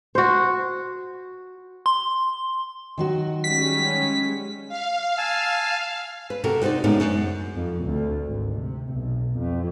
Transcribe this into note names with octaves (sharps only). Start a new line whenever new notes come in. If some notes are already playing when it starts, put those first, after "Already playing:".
F#4 C5
C6
D#3 F#3 F#4
G3 G#3 C#4 B6
F5
G#5 A5 E6
B4
C3 F#4 A4 A#4
D#4 F#4 B4 C5 D5
A2 C#3 G#3 B3 D4 D#4
F#2
F2
D2
G#1
C3
B1
F2